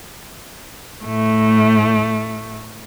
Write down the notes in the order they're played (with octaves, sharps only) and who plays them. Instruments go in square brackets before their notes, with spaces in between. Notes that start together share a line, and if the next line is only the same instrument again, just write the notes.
[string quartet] A2 A3